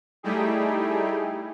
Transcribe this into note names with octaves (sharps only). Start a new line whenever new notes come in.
G3 A3 D#4 E4 G4 G#4